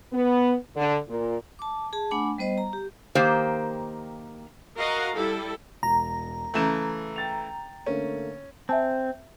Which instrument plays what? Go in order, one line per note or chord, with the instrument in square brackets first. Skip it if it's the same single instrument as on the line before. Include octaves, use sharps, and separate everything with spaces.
[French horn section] B3
D3
A#2
[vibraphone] A5 D6
G#4 A5
A3 D4 F#5 G#5 B5 D6
G3 B3 C5 D#5
A#5
G4
[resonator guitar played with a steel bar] D#3 A#3 G4 C5
[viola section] F#4 A#4 D#5 F5 F#5 A#5
G3 E4 A4
[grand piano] E1 [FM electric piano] A#5
[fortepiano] C#3 E3 A3 [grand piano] G6 E7
[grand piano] G5 A6 F7
[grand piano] D3 A3 A#3 [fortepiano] C#4
[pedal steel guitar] C4 [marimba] E5 G#5 A5